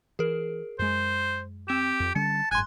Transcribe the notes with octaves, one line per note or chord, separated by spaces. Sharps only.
E3 G#4 A#4
F#2 G#3 C5
C4 G4 E7
F2
D3 G3 C#4 A5 C#7
F#1 G#2 G#5 C6 F#6